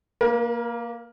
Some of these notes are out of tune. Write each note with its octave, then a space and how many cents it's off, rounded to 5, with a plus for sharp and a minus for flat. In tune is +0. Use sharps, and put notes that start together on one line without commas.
A#3 +0 A#4 +45